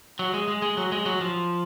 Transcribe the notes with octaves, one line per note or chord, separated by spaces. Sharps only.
F#3
G#3
G#3
G#3
F#3
G#3
F#3
F3